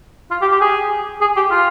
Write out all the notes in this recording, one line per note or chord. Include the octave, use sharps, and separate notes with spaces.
F4
G4
G4
G#4
G#4
G4
F4